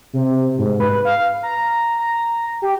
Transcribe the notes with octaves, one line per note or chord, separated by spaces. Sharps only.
C3
G#2
B4
F5
A#5
A#5
G4